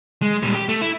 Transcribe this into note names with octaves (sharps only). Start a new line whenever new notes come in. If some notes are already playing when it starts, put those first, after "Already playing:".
G#3
A#2 G3
G4
A3
E4